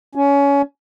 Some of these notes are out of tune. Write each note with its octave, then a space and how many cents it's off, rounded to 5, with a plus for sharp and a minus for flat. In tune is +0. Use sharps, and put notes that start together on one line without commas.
C#4 +25